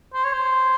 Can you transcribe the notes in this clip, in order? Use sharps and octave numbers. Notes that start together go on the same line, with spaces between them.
C5
C#5
C5